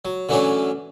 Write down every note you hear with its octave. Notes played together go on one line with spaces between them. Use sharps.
F#3
D3 E3 F#3 A3 C#4 D4